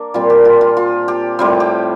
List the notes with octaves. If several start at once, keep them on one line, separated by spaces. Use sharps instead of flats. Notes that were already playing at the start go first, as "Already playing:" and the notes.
Already playing: A#3 D4 A#4
A#2 G3 C4 F4
G4
F4
F4
F4
G4
A2 G3 C4 F4
G4